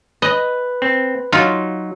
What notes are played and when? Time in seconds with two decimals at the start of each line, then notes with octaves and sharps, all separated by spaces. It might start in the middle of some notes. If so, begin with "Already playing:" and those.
0.22 B4 D#5
0.82 C4
1.33 F#3 D#4 F4